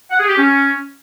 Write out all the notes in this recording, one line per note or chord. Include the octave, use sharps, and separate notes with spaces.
F#5
G#4
G4
C#4